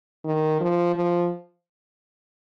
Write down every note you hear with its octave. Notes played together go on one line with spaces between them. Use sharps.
D#3
F3
F3